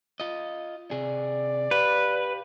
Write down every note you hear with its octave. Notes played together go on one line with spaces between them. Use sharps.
F4 D#5
C3 G#4 D5
G4 B4 F5